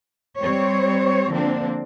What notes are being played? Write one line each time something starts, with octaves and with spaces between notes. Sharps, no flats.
G3 C4 C5 C#5
D3 F3 A#3 C4 D4